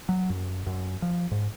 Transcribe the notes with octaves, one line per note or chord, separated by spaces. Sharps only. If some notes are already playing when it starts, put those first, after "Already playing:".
F#3
F#2
F#2
F3
G#2